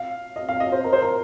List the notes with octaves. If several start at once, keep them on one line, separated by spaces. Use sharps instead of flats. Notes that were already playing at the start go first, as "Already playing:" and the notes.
Already playing: F5
D#5
F5
D#5
C5
A#4
C5
A#4